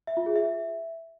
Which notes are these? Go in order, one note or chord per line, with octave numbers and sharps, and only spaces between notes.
E5
F4
G#4
E5